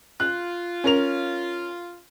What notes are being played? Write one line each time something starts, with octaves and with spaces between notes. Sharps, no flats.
F4 F#6
C#4 A#4 F7